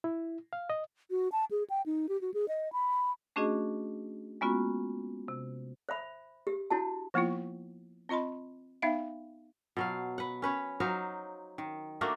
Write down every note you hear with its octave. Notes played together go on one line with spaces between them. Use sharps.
E4
F5
D#5
F#4
A5
G#4
G5
D#4
G4
F#4
G#4
D#5
B5
A3 C#4 D4 F#4 G#4 D#5
G#3 A#3 B3 C#4 F4 F#4
C3
C5 E5 B5
G4
D4 E4 F#4 A5
F3 A#3 B3 E4 F4
C4 F4 D#5 B5 C6
B3 D#4 E5 F5
B2 F#3 F5
B4 F#5
C#4 B4 C#5
F#3 D#4 C5 F5
D#3
A3 A#3 D4 F#4